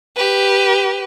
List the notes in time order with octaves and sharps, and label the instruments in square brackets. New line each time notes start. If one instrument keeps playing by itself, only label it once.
[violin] G4 B4